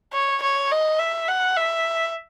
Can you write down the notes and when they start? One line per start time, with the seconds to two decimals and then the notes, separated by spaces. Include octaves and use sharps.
0.13 C#5
0.43 C#5
0.72 D#5
1.00 E5
1.28 F#5
1.57 E5